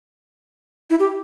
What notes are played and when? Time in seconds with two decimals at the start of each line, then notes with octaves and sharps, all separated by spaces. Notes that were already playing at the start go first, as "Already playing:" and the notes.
0.90 E4
1.00 G4